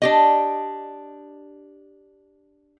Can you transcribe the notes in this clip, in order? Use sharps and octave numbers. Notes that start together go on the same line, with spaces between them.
D4 G4 D#5